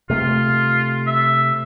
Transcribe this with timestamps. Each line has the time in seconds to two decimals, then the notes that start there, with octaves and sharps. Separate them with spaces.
0.10 C3 A3 F4
1.07 E5